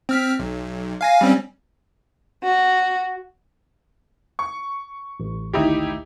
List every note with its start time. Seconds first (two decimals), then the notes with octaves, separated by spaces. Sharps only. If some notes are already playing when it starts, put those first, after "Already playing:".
0.09 C4 F6 B6
0.39 B1
1.01 F5 G#5 A#6
1.21 G3 C4 C#4
2.43 F#4
4.39 C#6
5.20 A1
5.53 G#1 D2 D#4 E4 G4